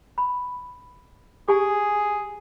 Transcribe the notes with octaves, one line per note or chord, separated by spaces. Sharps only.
B5
G4 G#4 G#5